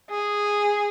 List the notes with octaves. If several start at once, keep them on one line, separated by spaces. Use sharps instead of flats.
G#4